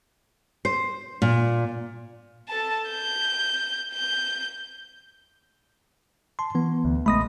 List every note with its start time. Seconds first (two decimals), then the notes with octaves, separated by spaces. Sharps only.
0.65 C5
1.22 A#2
2.48 A4 A5
2.90 G6
3.94 G6
6.39 A5 C6
6.55 E3 B3
6.85 D2
7.06 A#1 G#3 A3 B5 D#6 A#6